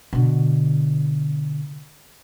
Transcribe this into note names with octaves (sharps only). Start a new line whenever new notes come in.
B2 D3